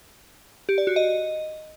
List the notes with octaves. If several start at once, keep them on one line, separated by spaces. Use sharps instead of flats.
G4
D5
F#4
D#5